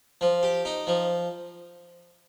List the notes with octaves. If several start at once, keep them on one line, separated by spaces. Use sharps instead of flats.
F3
G4
D#4
F3